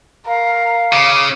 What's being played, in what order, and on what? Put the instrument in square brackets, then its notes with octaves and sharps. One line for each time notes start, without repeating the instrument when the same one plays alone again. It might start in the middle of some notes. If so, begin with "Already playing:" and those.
[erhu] A#4 [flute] F5
[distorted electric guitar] C#3 [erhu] D6